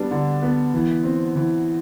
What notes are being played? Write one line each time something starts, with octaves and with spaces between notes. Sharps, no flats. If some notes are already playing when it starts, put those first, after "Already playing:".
Already playing: G3 B3 D4
D3
B3
E3
C4
E3